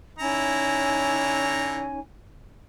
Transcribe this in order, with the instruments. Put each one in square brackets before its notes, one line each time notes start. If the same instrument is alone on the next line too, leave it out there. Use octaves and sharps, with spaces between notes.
[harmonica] D3 E4 A#5 [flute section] C#4 D#4 G#5